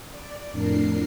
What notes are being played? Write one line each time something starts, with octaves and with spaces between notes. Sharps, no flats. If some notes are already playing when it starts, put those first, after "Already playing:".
D5
F2 A2 D4 A#4 C7